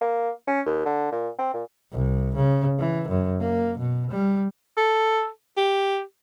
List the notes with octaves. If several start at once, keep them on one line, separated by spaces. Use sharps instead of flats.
A#3
C#4
D#2
D3
A#2
C4
A#2
C2
C#3
E3
F#2
A#3
B2
G3
A4
G4